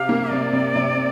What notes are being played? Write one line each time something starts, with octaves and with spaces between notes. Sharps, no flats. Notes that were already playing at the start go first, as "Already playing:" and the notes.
Already playing: C3 G4 F5
A#3
C3 D5
C3
C3